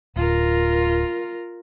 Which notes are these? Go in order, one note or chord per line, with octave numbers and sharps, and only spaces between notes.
D1 F4 A#4